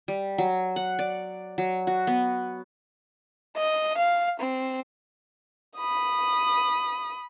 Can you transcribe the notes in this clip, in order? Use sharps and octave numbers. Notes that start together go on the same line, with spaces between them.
G3
F#3
F#5
D5
F#3
F#4
B3
D#5
F5
C4
B5 D#6